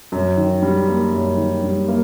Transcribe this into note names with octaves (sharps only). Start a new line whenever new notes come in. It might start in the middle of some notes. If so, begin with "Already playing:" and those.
F#2
D#3
G3
A#3
F#2
D#3
G3
A#3